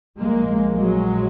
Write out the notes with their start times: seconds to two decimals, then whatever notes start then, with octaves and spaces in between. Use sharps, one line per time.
0.18 A#1 A#2 G#3 A#3
0.73 F#3 G#3